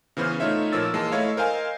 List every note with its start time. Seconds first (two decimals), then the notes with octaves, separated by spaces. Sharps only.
0.17 C#3 E3 B3 C5 F6
0.40 A3 D#4 F4 C#5 E5
0.72 A#2 F3 A#3 C#5 E6 A6
0.93 E3 G#3 A#3 A5
1.12 A3 E4 C#5 D#5 F5
1.37 A#4 C5 D#5 F5 G#5